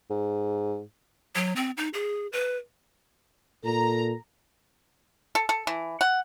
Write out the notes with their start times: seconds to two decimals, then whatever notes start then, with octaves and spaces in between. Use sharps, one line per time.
0.11 G#2
1.35 F#3
1.56 C4
1.77 D#4
1.93 G#4
2.32 B4
3.65 A#2 A4 A#5
5.35 A4
5.49 A4
5.67 E3
6.01 F#5